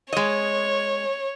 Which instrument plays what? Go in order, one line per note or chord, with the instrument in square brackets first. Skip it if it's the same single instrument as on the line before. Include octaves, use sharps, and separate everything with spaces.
[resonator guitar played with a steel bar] G#3 D#5 [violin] C#5